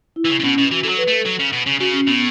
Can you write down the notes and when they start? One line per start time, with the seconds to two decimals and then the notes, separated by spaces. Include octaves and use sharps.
0.16 E4
0.25 E3
0.30 C#3
0.40 C#3
0.44 B2 C#4
0.58 B2
0.71 E3 F#4
0.83 E3 A4
0.89 F#3
0.98 B4
1.07 A3 A4
1.25 F#3
1.39 C#3
1.52 B2
1.66 C#3
1.80 C#3 F#4
1.93 C#4
2.07 A2 B3